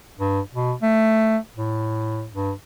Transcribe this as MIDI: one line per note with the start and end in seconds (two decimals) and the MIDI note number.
0.19 0.40 43
0.53 0.74 47
0.82 1.37 57
1.56 2.27 45
2.33 2.52 43